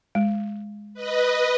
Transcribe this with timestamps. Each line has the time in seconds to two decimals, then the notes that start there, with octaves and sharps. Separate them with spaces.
0.15 G#3
0.94 B4 D#5